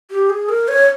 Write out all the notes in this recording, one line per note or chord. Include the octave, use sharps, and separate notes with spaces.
G4
G#4
A#4
C#5